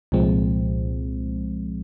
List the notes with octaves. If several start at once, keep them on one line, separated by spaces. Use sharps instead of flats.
C2 A#2 F3 G#3 C4